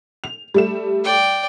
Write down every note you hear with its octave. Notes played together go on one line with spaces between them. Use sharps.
F7
G3 A3 E7
D5 G5